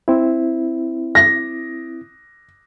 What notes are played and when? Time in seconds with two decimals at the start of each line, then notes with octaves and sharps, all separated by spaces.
0.08 C4 E4
1.15 A#6